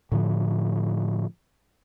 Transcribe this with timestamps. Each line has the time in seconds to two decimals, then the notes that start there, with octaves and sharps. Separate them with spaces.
0.12 A2 D3 F3